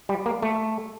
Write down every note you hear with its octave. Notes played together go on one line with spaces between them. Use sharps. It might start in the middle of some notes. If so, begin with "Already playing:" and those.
G3
A#3
A3